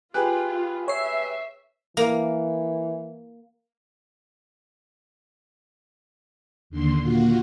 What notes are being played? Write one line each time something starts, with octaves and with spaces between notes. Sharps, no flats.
F4 G4 G#4 B4 F#6
C#5 E5 C7
E3 A#3
D#2 D3 C6
A#2 F4 F#4